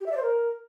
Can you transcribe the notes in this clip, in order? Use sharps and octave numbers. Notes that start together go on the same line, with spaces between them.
G4
E5
D5
C5
A#4